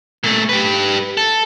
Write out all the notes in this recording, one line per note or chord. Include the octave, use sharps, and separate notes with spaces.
A#2 A3
G4 B4
A4